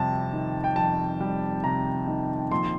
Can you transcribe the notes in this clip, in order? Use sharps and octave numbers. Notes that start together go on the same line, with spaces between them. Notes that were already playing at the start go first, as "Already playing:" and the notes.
Already playing: F2 C3 G3 A5
D#3
G5
F2 A5
G3
C3 A#5
D#3
A#1 C6